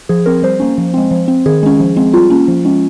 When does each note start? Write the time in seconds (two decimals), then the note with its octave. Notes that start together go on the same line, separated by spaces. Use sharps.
0.09 F3 G#4
0.26 C4 A#4
0.43 G3 C5
0.60 A#3 C#4
0.78 F3
0.94 G#3 C4
1.11 F3
1.28 C4
1.46 D#3 G#4
1.63 G#3 C#4
1.80 F3
1.96 G#3 C4
2.13 G3 F4
2.30 A#3 C#4
2.48 F3
2.65 G#3 C#4